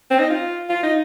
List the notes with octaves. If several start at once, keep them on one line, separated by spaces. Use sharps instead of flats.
C4
D#4
F4
F4
D#4